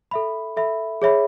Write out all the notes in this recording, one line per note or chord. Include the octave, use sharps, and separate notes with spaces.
A4 E5 B5
A4 E5 B5
G#4 C#5 E5 B5